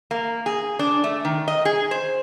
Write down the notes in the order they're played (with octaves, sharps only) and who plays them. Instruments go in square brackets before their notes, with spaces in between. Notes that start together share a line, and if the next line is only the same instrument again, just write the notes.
[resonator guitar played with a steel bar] A#3
G#4
D4
A3
D#3
D#5
G#4
C5